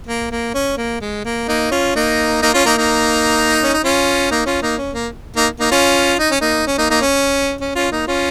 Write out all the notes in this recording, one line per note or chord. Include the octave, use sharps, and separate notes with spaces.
A#3
A#3
C#4
A#3
G#3
A#3
A#3 D#4
C#4 F4
A#3 D#4
A#3 D#4
C#4 F4
A#3 D#4
A#3 D#4
C#4
D#4
C#4 F4
A#3 D#4
C#4 F4
A#3 D#4
C#4
A#3
A#3 D#4
A#3 D#4
C#4 F4
D#4
C#4
A#3 D#4
C#4
A#3 D#4
A#3 D#4
C#4
C#4
C#4 F4
A#3 D#4
C#4 F4